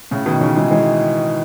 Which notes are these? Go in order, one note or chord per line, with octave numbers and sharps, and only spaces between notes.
A2 C#3
B2 D#3
C#3 E3
E3 G#3
E3 G#3